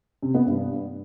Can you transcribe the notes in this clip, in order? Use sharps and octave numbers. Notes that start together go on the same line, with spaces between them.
C3
B3
G2